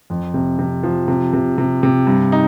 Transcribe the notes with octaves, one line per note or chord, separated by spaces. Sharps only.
F2
C3
C3
F3
C3
C3
C3
C3
G2
D#4